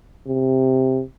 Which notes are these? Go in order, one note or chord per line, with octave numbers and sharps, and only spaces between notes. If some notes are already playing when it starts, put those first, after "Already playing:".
C3